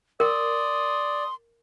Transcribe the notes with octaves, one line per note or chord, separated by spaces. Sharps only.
A#4 D5 C6 D#6